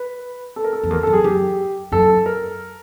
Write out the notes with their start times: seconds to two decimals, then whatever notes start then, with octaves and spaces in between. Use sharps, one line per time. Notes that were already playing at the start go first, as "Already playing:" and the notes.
Already playing: B4
0.56 A4
0.64 A#4
0.73 A4
0.83 F2
0.90 E2 A#4
1.03 F#2 A4
1.13 G#4
1.24 F#2 G4
1.92 F#2 A4
2.26 A#4